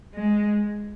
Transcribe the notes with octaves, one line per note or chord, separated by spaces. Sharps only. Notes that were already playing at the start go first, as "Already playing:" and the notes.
G#3